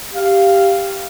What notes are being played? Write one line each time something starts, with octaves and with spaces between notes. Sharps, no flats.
G4 F5